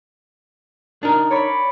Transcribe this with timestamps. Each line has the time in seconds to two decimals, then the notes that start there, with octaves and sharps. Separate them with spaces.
1.03 D4 D#4 A#4
1.31 C#5 D5 B5